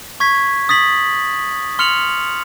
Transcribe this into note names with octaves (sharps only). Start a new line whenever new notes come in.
C#6 G#6 B6
D#6 A6 B6 F#7
C6 F6 C#7 F7 F#7